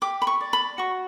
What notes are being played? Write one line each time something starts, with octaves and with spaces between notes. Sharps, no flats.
G4 D6
B5
C#6
D5
B5
F#4 C#6